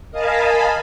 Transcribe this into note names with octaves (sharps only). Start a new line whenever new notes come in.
A#4 D#5 F5 G#5 A5 B5